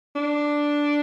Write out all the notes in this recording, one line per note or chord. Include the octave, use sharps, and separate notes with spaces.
D4